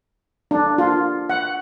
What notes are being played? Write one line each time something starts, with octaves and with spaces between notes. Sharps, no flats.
D4
F4
F#5